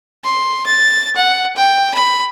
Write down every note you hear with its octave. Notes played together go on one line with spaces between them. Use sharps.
C6
A6
F#5
G5
B5